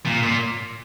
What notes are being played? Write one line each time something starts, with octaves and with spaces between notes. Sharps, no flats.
A#2
A#2